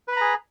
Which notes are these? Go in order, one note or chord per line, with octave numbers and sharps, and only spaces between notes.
G#4 B4 A#5 B5